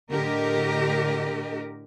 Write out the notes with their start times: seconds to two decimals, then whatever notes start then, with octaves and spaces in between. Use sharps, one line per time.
0.11 A2 D3 G4 A#4 D#5